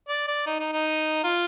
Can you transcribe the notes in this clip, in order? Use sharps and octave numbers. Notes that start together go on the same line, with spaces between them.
D5
D5
D#4
D#4
D#4
F4